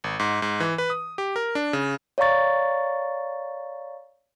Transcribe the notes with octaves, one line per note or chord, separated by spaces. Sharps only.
G#1
G#2
G#2
E3
B4
D#6
G4
A#4
D4
C#3
C#5 D5 F5 A#5 C#6 A6